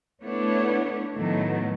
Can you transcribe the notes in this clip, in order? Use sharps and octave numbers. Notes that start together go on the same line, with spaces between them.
A3 B3 D4 E4 C#5
A2 D#3 F#3 A3 B3